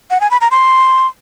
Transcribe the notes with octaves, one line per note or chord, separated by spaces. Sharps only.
F#5
G#5
B5
A#5
C6